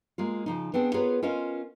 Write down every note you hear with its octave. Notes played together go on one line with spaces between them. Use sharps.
G#3 A#3 F4
C#3 F3 D#4
B3 C4 D4 G#4
B3 F4 G#4 A#4 B4 C#5
C#4 F4 A#4 C5 D#5 F5